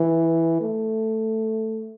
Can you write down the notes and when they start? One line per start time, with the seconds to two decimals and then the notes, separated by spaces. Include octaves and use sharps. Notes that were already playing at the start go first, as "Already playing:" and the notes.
Already playing: E3
0.61 A3